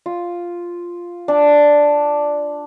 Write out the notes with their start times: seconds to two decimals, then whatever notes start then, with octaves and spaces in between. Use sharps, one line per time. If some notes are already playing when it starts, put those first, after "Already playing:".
0.06 F4
1.28 D4